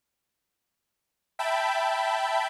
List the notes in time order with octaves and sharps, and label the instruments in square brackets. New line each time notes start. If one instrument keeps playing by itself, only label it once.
[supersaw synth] E5 G5 A5 B5